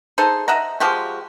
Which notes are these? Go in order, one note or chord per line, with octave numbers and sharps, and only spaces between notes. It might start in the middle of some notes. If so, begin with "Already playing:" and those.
D#4 G#4 A4 C5
D#5 E5 F#5 A#5
F3 G#3 F#4 G4